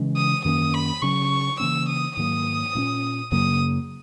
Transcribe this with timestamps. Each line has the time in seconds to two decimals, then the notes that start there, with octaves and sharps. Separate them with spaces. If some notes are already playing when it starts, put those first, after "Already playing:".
Already playing: C#3 E3 G#3 C#4
0.16 D#6
0.45 F#2 D#3 A#3 C#4 D#6
0.74 B5
1.02 C#3 F#3 C#4 C#6
1.60 C#3 E3 A#3 C#4 E6
1.89 D#6
2.16 G#2 D#3 F#3 A#3 D#6
2.75 A#2 A#3 C#4
3.32 F#2 C#3 F#3 A#3 D#6